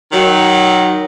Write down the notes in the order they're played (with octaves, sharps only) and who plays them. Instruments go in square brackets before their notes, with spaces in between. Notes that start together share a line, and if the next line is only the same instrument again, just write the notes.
[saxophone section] D#3 F#3